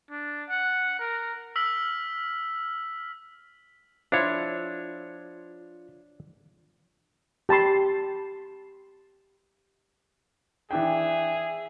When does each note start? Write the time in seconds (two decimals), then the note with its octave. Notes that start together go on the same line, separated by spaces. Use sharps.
0.10 D4
0.49 F#5
0.99 A#4
1.56 E6 F6 B6 F#7
4.12 F3 D4 E4 F4 C#5
7.49 G4 A5 B5 C6
10.71 E3 D4 G#4 E5 G5